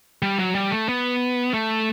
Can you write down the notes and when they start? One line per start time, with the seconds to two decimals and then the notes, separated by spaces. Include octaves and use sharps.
0.22 G3
0.39 F#3
0.55 G3
0.71 A3
0.89 B3
1.54 A3